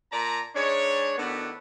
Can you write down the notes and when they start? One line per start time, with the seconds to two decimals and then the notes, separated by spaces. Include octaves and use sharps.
0.12 A#2 D5 A5 A#5
0.55 G#2 G#3 D4 C#5
1.17 A2 D#3 B3 D4 E4 F#4